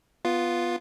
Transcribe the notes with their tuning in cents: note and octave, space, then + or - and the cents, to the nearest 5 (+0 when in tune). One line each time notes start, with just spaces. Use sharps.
B3 +0 F4 +0